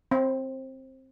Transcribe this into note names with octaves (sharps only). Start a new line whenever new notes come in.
C4